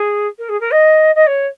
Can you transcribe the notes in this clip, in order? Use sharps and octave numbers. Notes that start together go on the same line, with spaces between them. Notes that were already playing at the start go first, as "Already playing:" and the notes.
Already playing: G#4
A#4
G#4
A#4
D#5
D#5
C#5